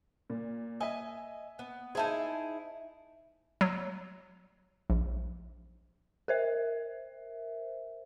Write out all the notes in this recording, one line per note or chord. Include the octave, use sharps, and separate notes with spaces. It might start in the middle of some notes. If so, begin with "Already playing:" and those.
A#2
D#5 E5 G#5
B3
D#4 E4 G#4 C5 A5
F#3
A#1
A#4 C5 E5